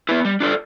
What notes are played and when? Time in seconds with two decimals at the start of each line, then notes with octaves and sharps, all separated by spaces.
0.09 B3 E4 B4
0.25 G3
0.40 D4 F4 A4 D5